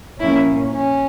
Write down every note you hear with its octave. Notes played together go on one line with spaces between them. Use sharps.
A#2 F3 A#3 C#4 E4
C#4